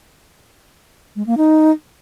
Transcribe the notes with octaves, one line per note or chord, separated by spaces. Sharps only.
G#3
A#3
D#4